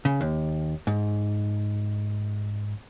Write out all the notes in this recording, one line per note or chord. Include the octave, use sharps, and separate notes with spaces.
C#3
D#2
G#2